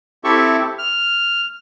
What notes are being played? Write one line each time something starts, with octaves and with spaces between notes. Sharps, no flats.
C4 E4 G4 A4 E5 C#6
F6